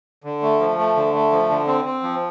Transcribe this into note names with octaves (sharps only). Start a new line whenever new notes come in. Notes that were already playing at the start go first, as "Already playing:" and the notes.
D3
A3
F3
A3
D3
A3
F3
D3
C4
C4
F3